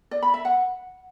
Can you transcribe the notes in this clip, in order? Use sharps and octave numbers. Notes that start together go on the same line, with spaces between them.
D5
B5
E5
F#5